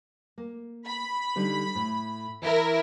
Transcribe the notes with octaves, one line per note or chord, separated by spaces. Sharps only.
A#3
B5
D3 G3 D#4
A2
E3 E4 A#4